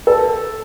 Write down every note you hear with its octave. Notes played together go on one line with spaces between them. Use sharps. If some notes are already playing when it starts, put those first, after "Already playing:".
A4